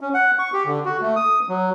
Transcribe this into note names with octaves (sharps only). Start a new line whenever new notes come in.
C#4
F#5
C#6
G4
D3
F#4
A3
D#6
F#3